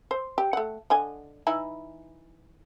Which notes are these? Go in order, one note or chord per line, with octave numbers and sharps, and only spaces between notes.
C5
G4
A3 F#5
D3 D#5 G#5
E3 D#4 E4